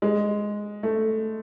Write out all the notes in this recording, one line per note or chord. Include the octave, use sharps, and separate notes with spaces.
G#3
A3